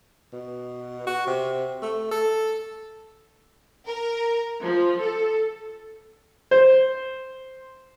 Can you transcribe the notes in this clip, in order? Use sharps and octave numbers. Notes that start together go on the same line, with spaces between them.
B2
F#4
C3
A3
A4
A#4
F3
A4
C5